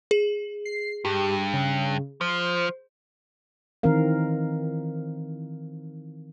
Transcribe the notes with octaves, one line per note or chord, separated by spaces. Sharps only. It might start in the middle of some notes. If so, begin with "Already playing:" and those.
G#4
C7
G2 G4
C#3
F3 C5
D#3 E3 C4 A#4 F5